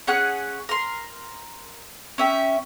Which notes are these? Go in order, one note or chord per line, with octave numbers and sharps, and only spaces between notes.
C#4 G#4 F#5 F#6
A#4 C6
C#4 E5 G5